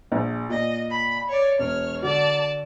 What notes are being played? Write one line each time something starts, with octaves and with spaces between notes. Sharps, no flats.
A#1
A#2 D#5
B5
C#5 D5
E1 C#5 F6
D3 F#4 D5 A5